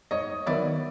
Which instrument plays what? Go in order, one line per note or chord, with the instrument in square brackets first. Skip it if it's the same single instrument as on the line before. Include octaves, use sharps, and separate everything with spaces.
[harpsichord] G#2 [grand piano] C#5 D#5
[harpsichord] D#3 F#3 B3 E4 [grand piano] D5 E5